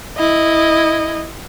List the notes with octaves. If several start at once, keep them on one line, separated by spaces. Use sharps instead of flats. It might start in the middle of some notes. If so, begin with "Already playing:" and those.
E4 D#5